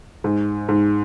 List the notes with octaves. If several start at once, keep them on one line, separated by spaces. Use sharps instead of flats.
G#2
G#2